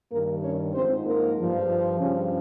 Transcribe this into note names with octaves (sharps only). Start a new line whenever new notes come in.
G2 D#3 A#3 A#4
C#4 C#5
G#2 F3 C4 C5
A#3 A#4
G2 F3
G2 C#3 F3 C#4